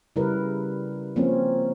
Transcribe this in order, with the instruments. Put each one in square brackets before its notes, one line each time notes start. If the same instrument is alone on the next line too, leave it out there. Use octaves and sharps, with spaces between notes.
[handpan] C#3 G3 E4 A#4 B4
F3 A#3 C4 C#4